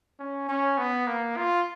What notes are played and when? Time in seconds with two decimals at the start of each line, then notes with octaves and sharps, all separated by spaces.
0.19 C#4
0.49 C#4
0.78 B3
1.07 A#3
1.37 F4